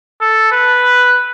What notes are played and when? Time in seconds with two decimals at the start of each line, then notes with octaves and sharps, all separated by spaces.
0.21 A4
0.52 B4